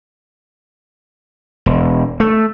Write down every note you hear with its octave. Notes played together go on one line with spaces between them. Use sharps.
E1
A3